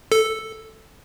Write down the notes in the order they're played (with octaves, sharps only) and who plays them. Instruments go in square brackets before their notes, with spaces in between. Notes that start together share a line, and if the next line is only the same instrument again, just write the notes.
[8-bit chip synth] A4